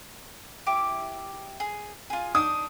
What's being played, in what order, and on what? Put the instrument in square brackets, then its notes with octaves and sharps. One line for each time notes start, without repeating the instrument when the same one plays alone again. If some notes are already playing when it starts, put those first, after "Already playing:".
[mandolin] E4 G4 D6
G#4
F4 G#4
[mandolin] D4 D#4 [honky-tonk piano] D#6